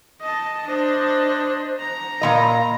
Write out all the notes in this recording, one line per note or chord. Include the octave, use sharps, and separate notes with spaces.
D#5 A5
D4 C5 D#5
A#5
A#2 E3 D#5 F5 B5